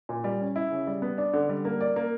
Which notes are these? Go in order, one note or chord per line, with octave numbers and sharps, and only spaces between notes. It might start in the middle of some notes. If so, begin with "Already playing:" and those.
A#2
G3
C#4
E4
C#3
G3
B3
D4
D3
G3
A#3
D5
A#3